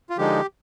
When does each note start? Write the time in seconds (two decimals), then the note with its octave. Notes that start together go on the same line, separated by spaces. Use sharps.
0.10 F4
0.18 D3 F3 G#3 D#4 G4